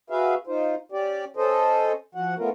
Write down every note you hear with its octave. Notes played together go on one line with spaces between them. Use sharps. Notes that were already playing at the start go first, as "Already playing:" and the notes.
F#4 G#4 B4 E5 F5
D#4 F4 C5
C#4 G4 D5
C#4 A4 C5 D#5
F3 F#4 F#5
A3 B3 C#4 F4 A#4